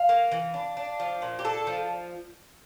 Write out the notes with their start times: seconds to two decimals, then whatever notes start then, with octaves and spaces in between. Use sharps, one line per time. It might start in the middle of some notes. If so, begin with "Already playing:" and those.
Already playing: F5
0.09 A#3
0.32 E3
0.54 D4
0.77 D4
1.00 F3
1.22 A#2
1.39 G4
1.44 D4 A4
1.67 F3